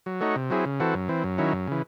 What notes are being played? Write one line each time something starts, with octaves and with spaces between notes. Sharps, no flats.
F#3
A3 D#4 F#4 C#5
C3
F#3 C4 E4 G#4
C#3
E3 C4 F#4 A4
F#2
E3 C4
F#2
D#3 F#3 C#4 E4
F#2
C#3 E3